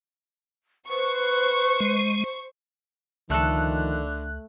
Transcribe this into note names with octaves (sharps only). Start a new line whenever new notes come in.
B4 C5 C#6
G#3
C#2 D3 D#3 F3 A3 A4 F#6